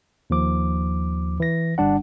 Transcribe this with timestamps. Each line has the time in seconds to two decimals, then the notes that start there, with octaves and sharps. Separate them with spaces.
0.30 D#2 F3 D6
1.40 E3 A#6
1.78 G1 G3 D4 F#5